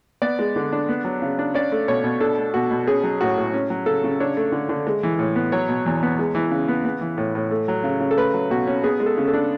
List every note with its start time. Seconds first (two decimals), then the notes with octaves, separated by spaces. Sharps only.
0.22 B3 D5
0.39 G#3
0.56 D3
0.72 D4
0.89 B3
1.05 F#3
1.22 C#3
1.39 D4
1.54 C#4 D5
1.72 A3
1.88 B2 C#5
2.04 B2
2.20 D4 A4
2.38 A3
2.54 B2 F#4
2.71 B2
2.87 C#4 G#4
3.04 F#3
3.21 A2 F#4
3.38 A2
3.54 C#4
3.70 F#3
3.86 C#3 A4
4.04 C#3
4.20 D4 C#5
4.37 A3
4.52 D3
4.69 D3
4.87 G#3
5.03 E3
5.19 A2
5.36 B3
5.52 F#3 C#5
5.69 B2
5.86 E2
6.03 B3
6.19 G#3
6.35 E3
6.51 C#3
6.68 B3
6.85 B3
7.01 E3
7.18 A2
7.35 A2
7.51 A3
7.68 F#3
7.84 C#3
8.00 C#3
8.11 A4
8.18 A3 B4
8.34 F#3
8.50 B2 F#4
8.67 C#4
8.83 B3 G#4
9.00 G#3
9.06 A4
9.18 C#3
9.27 A4
9.34 D4